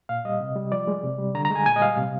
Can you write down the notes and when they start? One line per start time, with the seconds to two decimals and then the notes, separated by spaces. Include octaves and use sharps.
0.09 A#2 F5
0.25 G3 D#5
0.41 C3
0.56 G3
0.72 F3 D5
0.88 G#3
1.04 C3
1.19 G3
1.35 D3 A#5
1.45 A#5
1.50 G#3
1.55 G#5
1.66 A#2 G#5
1.76 D#5
1.81 G3 F5
1.98 C3